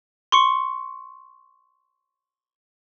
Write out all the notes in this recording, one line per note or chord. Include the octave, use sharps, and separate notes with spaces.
C6 C#6 C#7